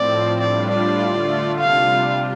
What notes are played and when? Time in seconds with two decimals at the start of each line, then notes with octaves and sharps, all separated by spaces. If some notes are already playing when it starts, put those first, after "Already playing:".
Already playing: A2 F3 C4 D5
0.41 A2 G3 D4 F4 D5
0.72 D5
1.01 D3 A3 F4
1.60 C3 G3 D4 F4 F5